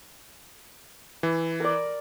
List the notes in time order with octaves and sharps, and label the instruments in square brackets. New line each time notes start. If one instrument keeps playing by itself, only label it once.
[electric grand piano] E3
[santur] A#4 D5